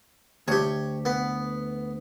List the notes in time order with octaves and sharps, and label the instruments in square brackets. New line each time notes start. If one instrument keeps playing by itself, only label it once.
[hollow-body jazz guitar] D2 [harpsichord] G4 C#5
[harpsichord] B3